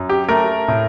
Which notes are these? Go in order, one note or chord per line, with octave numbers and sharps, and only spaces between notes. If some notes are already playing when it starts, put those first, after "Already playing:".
Already playing: F#2
G4
A3 A#4
A2